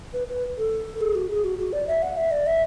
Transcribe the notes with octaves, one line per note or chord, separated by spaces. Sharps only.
B4
B4
A4
G#4
F#4
G#4
F#4
F#4
D5
E5
F#5
E5
D5
E5